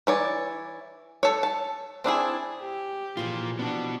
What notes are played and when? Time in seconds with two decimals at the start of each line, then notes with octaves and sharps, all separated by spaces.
0.07 E3 C#5 D5
1.23 A4 C#5
1.43 A5
2.04 C4 D4 E4 G#4
2.61 G4
3.17 A#2 E3 F3 F4 G#4
3.59 B3 D4 F#4